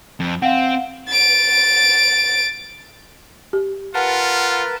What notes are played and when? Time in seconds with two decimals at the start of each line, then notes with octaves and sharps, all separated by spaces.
0.20 F2
0.42 C4 F5 F#5
1.07 A6 D7
3.53 G4
3.94 F4 A#4 B4 F#5 A5